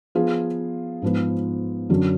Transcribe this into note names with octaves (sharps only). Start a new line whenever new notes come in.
F3 B3 F4 G#4
G#2 F3 B3 F4
F#2 D3 F#3 C#4